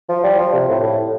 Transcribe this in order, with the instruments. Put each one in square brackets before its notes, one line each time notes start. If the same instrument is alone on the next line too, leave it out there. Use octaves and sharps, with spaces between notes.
[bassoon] F3
G3
F3
C3
A2
A2